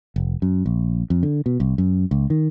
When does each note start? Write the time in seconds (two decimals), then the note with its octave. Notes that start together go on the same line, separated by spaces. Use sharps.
0.16 F1
0.42 F#2
0.66 A#1
1.10 F2
1.23 D3
1.46 B2
1.60 C2
1.78 F#2
2.11 C#2
2.30 D#3